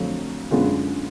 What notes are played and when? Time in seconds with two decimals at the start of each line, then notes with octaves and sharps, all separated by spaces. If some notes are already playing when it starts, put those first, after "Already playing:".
Already playing: F2 D3 F#3 A3
0.51 F#2 D3 G#3 B3 F4